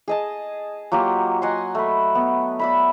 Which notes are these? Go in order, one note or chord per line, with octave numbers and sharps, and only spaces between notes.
G#4 D#5 A5
F#3 A#3 F4 G4
D#5 F#5 G#5 C6
A3 B5
B3
D5 E5 B5